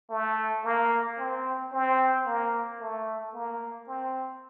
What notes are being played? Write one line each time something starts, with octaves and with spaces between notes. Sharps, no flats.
A3
A#3
C4
C4
A#3
A3
A#3
C4